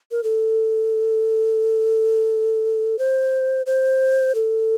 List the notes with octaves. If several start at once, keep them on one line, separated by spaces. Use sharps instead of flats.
A#4
A4
C5
C5
A4